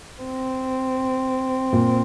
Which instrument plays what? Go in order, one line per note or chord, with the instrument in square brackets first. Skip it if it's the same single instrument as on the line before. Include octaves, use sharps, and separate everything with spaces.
[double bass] C4
[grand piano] A#2